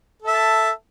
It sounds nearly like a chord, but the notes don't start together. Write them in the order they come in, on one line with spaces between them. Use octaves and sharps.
A4 E5 A5